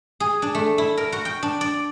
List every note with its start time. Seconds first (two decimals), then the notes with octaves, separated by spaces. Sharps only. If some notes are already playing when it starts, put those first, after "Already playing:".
0.20 G#4
0.42 D4
0.55 A3
0.78 E4
0.97 A#4
1.12 F#4
1.25 G5
1.43 D4
1.61 D5